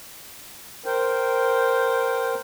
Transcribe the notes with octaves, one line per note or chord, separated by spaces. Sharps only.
A#4 C5 G5